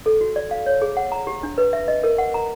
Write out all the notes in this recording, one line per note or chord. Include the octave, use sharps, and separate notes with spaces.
A4
F#4
D5
F5
C#5
G#4
F#5
A#5
G4
D4
B4
E5
D#5
A#4
F#5
A#5